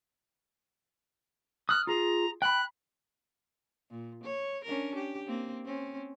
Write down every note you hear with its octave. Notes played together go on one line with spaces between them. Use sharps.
D#6 F6 F#6
F4 G#4 A#5
G5 B5 F#6
A#2
C#5
C#4 D4 A#4
G4
A#3 C4
C4 C#4